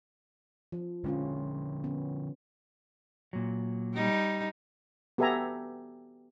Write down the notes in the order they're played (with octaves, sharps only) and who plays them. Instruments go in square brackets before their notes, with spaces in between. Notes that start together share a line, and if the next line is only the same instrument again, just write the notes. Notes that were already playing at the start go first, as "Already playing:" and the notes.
[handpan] F3
[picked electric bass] D3 F3 [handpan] G#3 C#4 F4
[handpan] B3 C#4
[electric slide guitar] A#2 F#3
[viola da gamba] G3 D#4
[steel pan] B3 G4 A4 E5 G#5 A#5